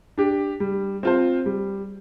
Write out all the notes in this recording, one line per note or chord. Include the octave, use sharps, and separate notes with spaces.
D4 G4
G3
C4 F4 C5
G3